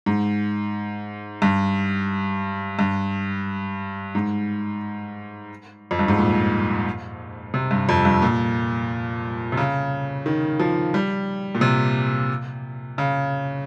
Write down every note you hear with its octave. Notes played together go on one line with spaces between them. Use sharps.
G#2
G2
G2
G#2
F2
G2
G#2
A#2
C3
G2
F2
G2
A#2
C3
C#3
D#3
F3
G3
A#2
C3
C#3